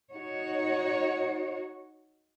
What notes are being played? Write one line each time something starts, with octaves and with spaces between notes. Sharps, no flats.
D#4 F#4 C#5